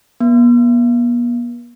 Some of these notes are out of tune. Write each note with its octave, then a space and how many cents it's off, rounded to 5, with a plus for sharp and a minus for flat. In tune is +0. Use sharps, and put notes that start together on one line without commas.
B3 -45